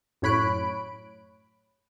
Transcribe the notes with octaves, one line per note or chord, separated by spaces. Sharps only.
F#2 A2 C#5 B5 F#6 D7